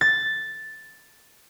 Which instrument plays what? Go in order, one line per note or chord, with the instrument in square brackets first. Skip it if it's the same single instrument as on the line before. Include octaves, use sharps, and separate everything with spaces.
[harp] A6